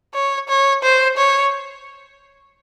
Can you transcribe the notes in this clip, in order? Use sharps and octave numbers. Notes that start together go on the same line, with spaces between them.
C#5
C#5
C5
C#5